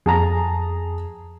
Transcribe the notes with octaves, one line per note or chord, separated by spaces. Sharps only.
F2 G#4 A5 A#5